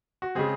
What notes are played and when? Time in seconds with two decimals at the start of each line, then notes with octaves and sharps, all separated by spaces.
0.22 F#4
0.35 C#3 G#3 C4 G#4